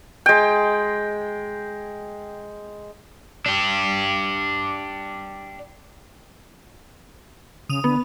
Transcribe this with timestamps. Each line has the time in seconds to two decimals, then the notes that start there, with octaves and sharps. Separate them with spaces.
0.26 G#3 G5
3.46 D4 G4
7.69 C#3 D#6 F7
7.84 D3 B3